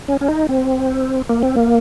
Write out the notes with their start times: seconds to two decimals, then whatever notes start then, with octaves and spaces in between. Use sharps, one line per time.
0.08 C#4
0.21 C#4
0.28 D#4
0.49 C4
1.29 A#3
1.43 C4
1.56 A#3